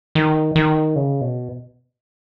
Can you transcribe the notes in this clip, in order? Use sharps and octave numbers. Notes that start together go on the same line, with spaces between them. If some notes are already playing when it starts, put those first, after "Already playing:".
D#3
D#3
C#3
B2